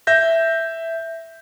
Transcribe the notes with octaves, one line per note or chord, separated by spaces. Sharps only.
E5 G6 A#6